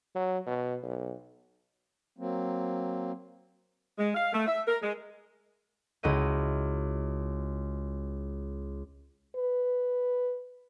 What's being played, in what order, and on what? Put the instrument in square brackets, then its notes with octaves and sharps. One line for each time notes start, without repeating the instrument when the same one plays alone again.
[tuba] F#3
B2
B1
[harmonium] F#3 A#3 C4
[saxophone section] G#3
F5
A3
E5
A#4
G#3
[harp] C#2 E4 F#4 D#5 D#7
[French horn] B4